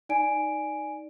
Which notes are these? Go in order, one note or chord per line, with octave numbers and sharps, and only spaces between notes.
D#4 D5 G#5 D7